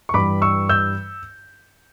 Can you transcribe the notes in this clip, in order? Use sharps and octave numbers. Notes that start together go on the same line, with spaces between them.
C#6
G2 E3 G3 B5 D6
C#6 E6
E6 G6